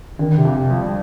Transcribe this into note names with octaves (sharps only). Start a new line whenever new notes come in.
D3 D#3
C3
F2
F3
G3